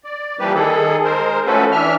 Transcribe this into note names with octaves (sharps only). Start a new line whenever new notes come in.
D5
E3 F3 G3 A#3 G4 B4
D#3 G#4 A4
G#3 A#4 C5
F3 A3 C#4 F#4 A4 B4
E3 D4 E5 F6